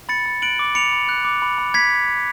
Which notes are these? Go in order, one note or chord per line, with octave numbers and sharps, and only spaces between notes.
B5 A6 C#7
B5
F#6 D7 F#7
D6
B5 C#7 F7
B5
F#6
D6
B5
B5
B5 G#6 B6